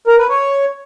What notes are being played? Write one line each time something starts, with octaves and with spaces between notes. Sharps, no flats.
A#4
B4
C#5